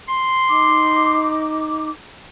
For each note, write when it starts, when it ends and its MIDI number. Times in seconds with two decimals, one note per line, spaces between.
0.08 1.47 84
0.49 1.89 63
0.49 1.89 86